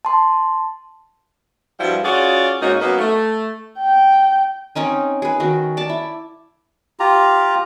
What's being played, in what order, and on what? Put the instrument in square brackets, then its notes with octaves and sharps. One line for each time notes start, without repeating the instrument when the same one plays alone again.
[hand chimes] A5 C6
[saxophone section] G2 F3 G3 E4 F#4
C#4 F4 F#4 G#4 D5
G#2 A#3 C#4 D#4 F#4
F#3 A#3 B3 C#4 D#4
A3
[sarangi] G5
[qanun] C4 C#4 D#4 G#5
G#4 B4
D#3 F#4
D5 A5
E4
[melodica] F4 G4 A#5